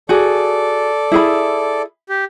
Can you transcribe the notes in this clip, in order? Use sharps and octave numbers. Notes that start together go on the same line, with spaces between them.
F#4 G#4 A4 D5
E4 G#4 B5
G4